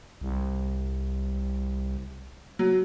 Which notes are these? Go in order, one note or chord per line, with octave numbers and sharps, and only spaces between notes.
C2
F#3